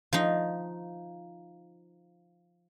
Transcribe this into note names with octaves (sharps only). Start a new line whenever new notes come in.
F3 D#4